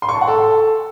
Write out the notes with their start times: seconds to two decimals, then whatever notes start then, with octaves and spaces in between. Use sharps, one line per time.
0.02 C6
0.09 C#6
0.15 A5
0.21 F#5
0.28 A4